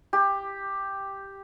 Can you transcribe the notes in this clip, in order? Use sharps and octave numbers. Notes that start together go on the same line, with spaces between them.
G4